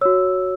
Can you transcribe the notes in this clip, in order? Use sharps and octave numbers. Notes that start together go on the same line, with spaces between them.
F#4 C#5 E6